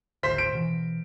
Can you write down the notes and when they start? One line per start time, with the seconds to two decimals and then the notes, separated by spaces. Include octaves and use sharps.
0.23 G#1 D2 C5 B6
0.38 D7
0.53 B2 D#3 E3